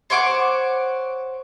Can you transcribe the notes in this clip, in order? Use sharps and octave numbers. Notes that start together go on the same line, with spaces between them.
C5 C#5 F#5 D6